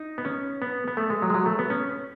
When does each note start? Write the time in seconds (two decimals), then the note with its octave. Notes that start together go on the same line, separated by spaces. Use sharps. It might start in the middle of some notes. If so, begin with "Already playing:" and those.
Already playing: D#4
0.18 B3
0.25 C#4
0.62 B3
0.88 B3
0.97 A3
1.10 G#3
1.22 F#3
1.30 G#3
1.34 F#3
1.46 A3
1.59 B3
1.70 C#4